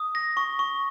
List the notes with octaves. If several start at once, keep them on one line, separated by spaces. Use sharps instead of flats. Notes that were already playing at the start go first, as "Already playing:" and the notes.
Already playing: D#6
A#6
C#6
C#6